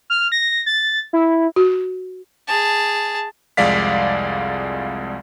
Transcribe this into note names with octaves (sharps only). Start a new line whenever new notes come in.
F6
A#6
A6
E4
F#4
G#4 A5
C2 F2 G#3 D5 F5 B6